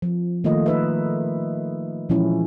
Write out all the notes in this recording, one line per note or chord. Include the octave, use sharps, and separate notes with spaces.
F3
D#3 A3 A#3 F4 D#5
D#4 B4 E5
A#2 E3 F3 G#3 C#4 E4